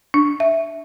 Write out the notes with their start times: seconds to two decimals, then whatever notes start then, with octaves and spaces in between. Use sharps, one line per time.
0.14 D4
0.40 E5